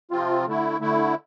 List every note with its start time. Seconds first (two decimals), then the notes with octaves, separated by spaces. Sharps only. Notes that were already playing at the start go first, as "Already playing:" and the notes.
0.11 C3 F3 C4 F4
0.46 D3 A3 E4
0.80 D3 A3 E4